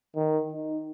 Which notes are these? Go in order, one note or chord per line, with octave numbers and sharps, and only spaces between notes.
D#3
D#4